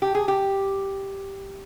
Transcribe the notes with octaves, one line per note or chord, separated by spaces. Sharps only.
G4
G#4
G4